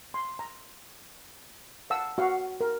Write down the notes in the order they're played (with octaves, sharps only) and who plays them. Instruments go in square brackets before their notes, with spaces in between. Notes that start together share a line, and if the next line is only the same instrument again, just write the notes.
[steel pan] C6
A#5
F5 F#5 A5 E6
F#4 F5 F#5
A#4